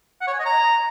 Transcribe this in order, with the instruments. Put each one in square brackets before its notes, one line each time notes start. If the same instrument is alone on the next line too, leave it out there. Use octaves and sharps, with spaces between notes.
[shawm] F#5
C#5
G#5
D#5
A#5